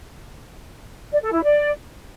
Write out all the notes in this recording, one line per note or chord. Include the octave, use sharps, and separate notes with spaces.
D5
A4
E4
D5